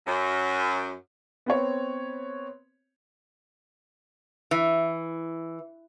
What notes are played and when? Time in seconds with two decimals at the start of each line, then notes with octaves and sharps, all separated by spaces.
0.07 F#2
1.46 B3 C4 C#5
4.51 E3